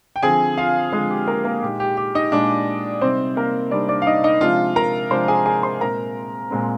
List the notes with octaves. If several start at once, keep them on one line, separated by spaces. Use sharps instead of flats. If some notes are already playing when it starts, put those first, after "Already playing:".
G5
D3 F3 C4 G#4 G#5
F4 F5
D3 F3 G#3 C4 G#4
G4
A#3 A#4
A#3 A#4
A#2 G#3 D#4 G4
G4
G4
D#4 D#5
A#2 G#3 D4 D#4 D5
C3 G3 C4 D#4 C5
A#3 A#4
C3 G3 C4 D4 D#4 D5
D4 D5
F5
D#4 D#5
D#4 D#5
C3 F3 G#3 D4 F4 F5
A#4 A#5
C3 F3 G#3 D4 C5 C6
G#4 G#5
G#4 G#5
C5 C6
A#2 G#3 C4 A#4 A#5
A#2 G#3 C4